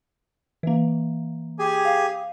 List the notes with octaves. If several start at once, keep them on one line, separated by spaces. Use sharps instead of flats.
E3 A#3
G4 G#4 G#5
F5